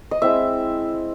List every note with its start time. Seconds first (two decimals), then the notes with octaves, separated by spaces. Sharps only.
0.11 D#5
0.22 G#3 C4 E4 E5